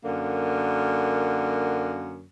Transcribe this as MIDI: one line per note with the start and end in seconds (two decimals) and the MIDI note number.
0.05 2.26 42
0.05 2.26 50
0.05 2.26 58